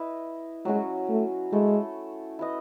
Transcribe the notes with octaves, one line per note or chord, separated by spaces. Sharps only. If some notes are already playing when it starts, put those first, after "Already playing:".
Already playing: E4 B4 D#5
F#3 G#3 C#4 F#4
A3
G#3 A3 E4 A4
E4 B4 D#5